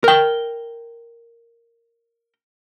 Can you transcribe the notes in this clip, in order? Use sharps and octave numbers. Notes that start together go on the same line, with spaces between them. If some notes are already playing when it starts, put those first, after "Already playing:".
A#4 G5